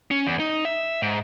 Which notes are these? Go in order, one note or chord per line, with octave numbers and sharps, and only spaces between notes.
C#4
E2
D#4
E5
G#2